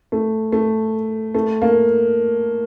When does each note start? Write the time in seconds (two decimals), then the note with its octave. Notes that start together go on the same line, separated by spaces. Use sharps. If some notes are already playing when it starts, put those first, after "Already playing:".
0.12 A3
0.52 A3
1.35 A3
1.62 A#3